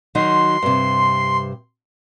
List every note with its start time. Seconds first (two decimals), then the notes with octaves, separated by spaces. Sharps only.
0.15 D#3 F#3 D#4 C6
0.62 G2 C3